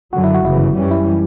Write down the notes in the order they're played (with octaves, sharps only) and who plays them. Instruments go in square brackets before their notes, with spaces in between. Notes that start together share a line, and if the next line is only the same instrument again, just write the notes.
[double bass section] F#2 D3 F#3 [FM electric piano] F#4
[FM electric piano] E4
F#4
[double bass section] G1 F#2 C#3 E3 [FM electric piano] E4
[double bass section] F#2 E3 G3 C#4
[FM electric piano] E4